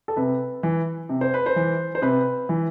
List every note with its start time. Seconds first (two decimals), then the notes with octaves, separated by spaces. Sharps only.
0.08 A4
0.16 C3 B4
0.63 E3
1.09 C3
1.21 C5
1.34 B4
1.46 C5
1.56 E3
1.95 C5
2.02 C3 B4
2.49 E3